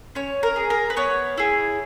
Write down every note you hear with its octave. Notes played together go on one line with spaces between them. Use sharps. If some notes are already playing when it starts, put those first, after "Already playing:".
C#4 C#5
A#4
G#4
A#4
B4
B3 C#5
E4 G#4